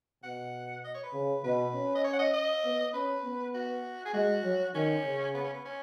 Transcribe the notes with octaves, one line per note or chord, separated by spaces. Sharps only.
B2 F#5
D#5
C#5
B4
C#3
B2 B4
C#4
D#5
C#5
F#5
D#5
D#5
B3
C#4 B4
B3
F#4
G#4
G#3 F#4
F#3
D#3 C#4
C#3
B3
C#4
B3
C#4